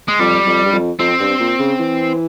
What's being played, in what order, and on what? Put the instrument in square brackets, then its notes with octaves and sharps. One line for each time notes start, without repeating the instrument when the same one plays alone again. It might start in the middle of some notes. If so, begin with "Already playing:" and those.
[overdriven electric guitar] G#3
[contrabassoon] F2 [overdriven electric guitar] G3
[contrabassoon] F2
G2
F2
[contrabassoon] F2 [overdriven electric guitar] C4
[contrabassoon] G2
A#2
C#3
E3